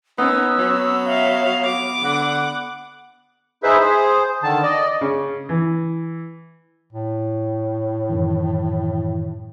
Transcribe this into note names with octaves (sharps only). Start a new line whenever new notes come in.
B3 C#4 D#4 E6
F#3
E5 F5
D6
D3 F#5
D#4 E4 G#4 B4 C5 E5
G#4 C5
D3 D#3 A5
D5 D#5
C#3
E3
A2
F#2 D#3 E3